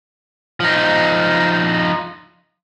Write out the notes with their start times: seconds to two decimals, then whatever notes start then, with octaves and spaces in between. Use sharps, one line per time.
0.60 F3 D#4